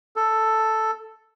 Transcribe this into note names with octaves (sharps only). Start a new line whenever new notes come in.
A4